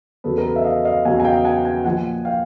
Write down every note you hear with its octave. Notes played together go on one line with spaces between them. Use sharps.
E2 C#3 F#3 A4 B4
A#4
A4 B4
E5
D#5 F5
D#5 F5
E2 C#3 F#3 F#5 G#5
G#5
F5 G5
F#5 G#5
F#5 G#5
A#2 F3 F#5 G#5
F5 G5